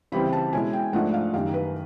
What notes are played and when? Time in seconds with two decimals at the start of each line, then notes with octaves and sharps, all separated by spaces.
0.12 C#3 E3 G3 C4 E4 B5
0.33 A5
0.53 B2 G#3 C#4 E4 G#5
0.73 G5
0.93 G#2 F3 A3 D4 F#5
1.14 F5
1.33 F#2 D#3 G3 F5
1.54 B4